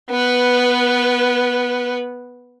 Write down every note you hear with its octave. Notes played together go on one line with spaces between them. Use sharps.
B3 B4